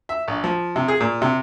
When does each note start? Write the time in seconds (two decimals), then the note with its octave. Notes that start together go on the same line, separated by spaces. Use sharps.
0.09 E5
0.28 A#1
0.44 F3
0.76 C3
0.88 G#4
1.00 A#2
1.22 C3